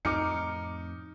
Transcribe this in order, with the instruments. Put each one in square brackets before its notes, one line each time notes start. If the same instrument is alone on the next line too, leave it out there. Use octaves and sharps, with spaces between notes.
[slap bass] F2 A2 C4 [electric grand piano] D#4 [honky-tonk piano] D6 F6 C#7